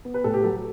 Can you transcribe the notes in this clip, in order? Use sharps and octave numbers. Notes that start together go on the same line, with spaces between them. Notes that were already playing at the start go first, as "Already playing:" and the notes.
B3
B4
A2 A4
G4
F#3 A4